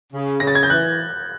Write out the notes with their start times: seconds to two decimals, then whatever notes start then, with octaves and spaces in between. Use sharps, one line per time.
0.13 C#3
0.40 C#3 A#6
0.47 A6
0.55 G#6
0.63 G6
0.70 E3 F#6